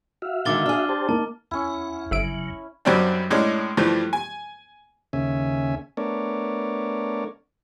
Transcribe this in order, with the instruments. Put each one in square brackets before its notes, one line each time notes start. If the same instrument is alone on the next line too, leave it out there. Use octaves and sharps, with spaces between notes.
[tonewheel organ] F#4 E5 F5
[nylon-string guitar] D3 D#3 G#3 [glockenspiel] D6 A6 G7
[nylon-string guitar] D4 G#4 [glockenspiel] F6
[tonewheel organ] G4 C5 A5
[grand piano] A#3 [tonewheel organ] D#4 [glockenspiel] A5
[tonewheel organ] E2 F#5 [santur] C#4 E4
[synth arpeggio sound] G1 E5 D7 [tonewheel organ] E2 C#3 F#3
[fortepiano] F#2 B2 G3 C4 D4
A2 G#3 C#4 D4
G2 E3 F3 G3 A3
G#5
[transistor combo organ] D#2 C#3 C#4 E5 G#5
A3 B3 D4 A#4 C#5 D5